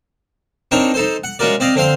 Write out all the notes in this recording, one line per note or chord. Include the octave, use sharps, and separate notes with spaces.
C4 D4 D#4 A#4 C#5
D#4 A4 C5
F#5
G#3 C#4 F4 F#4 A#4 D5
C4 D5 D#5 F5
D3 C4 C5 F5 C6